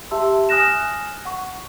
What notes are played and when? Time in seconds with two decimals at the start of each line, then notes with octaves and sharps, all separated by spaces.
0.11 G4 E5 A5 C6 E6
0.49 G#5 D#6 F6 F#6 A#6 E7
1.25 F#5 C#6